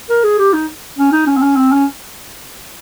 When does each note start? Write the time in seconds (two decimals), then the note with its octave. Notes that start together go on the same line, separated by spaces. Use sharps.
0.09 A#4
0.24 G#4
0.39 G4
0.53 D#4
0.98 C#4
1.12 D#4
1.27 C#4
1.37 C4
1.42 C#4
1.56 C4
1.72 C#4